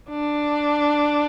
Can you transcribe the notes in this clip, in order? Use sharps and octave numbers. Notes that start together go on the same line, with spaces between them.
D4